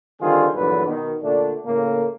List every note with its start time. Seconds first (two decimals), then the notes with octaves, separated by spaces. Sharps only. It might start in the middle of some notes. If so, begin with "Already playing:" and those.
0.21 D3 D#3 G3 C4 F4 G#4
0.55 A#1 E2 G2 D3 F#3 B4
0.87 B2 D#3
1.23 A#2 D3 A3 D4
1.66 A2 C#3 A3 A#3